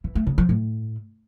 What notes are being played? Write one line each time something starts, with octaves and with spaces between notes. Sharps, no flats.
E3
A3
C#3
F3
A2